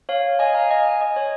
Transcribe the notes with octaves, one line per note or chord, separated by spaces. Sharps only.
C#5 F5
D#5 G#5
F5 A#5
D#5 G#5
D#5 G#5
D#5
C#5